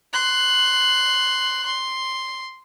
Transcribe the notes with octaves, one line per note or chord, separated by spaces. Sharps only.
C6 F#6
C6